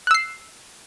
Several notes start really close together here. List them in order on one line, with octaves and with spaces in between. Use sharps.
F#6 E6 C7